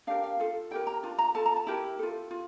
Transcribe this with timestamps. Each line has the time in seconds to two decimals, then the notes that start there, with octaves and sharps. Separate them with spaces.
0.07 D4 G4 A#4 F5
0.24 F5
0.40 F4 A4
0.71 E4 G4 A#4 G5
0.87 A#5
1.03 D4 F4
1.18 A#5
1.35 F4 A4 A5
1.46 A#5
1.57 A5
1.67 E4 G4 A#4
1.99 F4 A4
2.31 F4